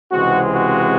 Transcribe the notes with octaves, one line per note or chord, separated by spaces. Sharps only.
C#2 C3 E3 G#3 C4 F#4
F#4